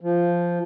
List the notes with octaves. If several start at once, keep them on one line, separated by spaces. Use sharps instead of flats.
F3